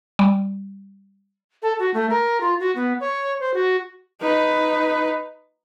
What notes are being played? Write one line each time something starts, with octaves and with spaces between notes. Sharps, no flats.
G3
A4
F#4
A3
A#4
F4
F#4
B3
C#5
C5
F#4
D#4 B4